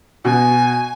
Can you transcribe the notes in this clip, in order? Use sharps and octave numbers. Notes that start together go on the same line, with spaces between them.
B2 F#4 G#5